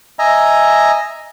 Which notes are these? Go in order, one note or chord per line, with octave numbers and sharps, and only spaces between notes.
D#5 E5 G#5 A#5